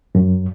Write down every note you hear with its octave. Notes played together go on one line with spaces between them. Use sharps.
F#2